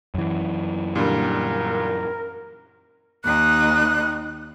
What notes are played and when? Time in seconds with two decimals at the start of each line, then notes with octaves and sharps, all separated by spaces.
0.15 F#2 E3
0.95 A#2 D3 G3 A#4
3.24 D#2 D#4 F#6